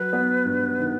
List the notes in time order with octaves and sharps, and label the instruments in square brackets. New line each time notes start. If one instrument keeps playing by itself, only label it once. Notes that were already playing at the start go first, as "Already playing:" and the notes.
Already playing: [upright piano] F#3 [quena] B4
[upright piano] B3
G2
D#3